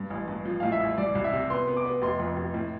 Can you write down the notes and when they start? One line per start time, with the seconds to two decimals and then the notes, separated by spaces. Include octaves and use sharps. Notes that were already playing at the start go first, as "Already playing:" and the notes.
Already playing: G2
0.10 A1
0.28 G2
0.45 F3
0.60 A2 F5
0.72 E5
0.80 A1
0.98 C2 D5
1.15 C2
1.24 E5
1.33 C3
1.50 B3 C6
1.68 B3
1.77 D6
1.85 B3
2.02 F1 C6
2.20 F2
2.36 F1
2.54 A2